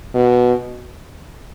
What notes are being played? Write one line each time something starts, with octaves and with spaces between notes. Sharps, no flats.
B2